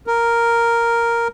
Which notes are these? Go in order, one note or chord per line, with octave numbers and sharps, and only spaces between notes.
A#4